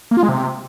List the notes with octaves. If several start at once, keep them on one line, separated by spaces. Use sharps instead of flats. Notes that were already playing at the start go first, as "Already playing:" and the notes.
A#3
F4
G#3
C3